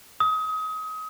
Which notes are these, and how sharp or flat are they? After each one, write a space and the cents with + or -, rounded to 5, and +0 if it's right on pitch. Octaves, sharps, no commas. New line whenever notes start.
D#6 +30